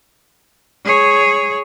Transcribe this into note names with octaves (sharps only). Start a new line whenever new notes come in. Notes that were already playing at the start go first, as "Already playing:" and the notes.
G#4 C#5